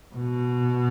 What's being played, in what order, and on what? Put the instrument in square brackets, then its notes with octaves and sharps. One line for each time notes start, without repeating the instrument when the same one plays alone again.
[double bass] B2